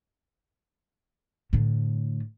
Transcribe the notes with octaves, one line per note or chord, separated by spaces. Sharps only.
A2 D3